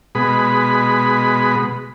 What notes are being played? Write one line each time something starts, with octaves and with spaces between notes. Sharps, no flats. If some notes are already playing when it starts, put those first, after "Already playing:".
B2 G#3 B5